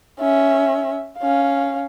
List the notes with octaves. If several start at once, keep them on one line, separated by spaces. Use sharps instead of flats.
C#4 E5
C#4 F5